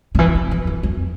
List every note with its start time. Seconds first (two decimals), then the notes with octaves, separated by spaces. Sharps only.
0.15 D3
0.19 E3
0.35 E3
0.51 F2
0.67 F2
0.83 F2